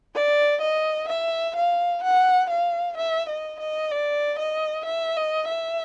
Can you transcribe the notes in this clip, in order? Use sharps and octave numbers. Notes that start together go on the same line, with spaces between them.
D5
D#5
E5
F5
F#5
F5
E5
D#5
D#5
D5
D#5
E5
D#5
E5